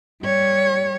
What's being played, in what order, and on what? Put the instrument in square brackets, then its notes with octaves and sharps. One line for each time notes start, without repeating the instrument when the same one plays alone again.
[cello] G3 C#5